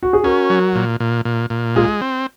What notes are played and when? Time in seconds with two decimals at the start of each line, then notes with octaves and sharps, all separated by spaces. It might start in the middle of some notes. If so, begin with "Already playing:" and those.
0.03 F#4
0.13 G#4
0.24 C#4 F#4 A#4
0.50 F#3
0.75 A#2
1.00 A#2
1.25 A#2
1.50 A#2
1.76 G#3 F4 G#4
2.01 C4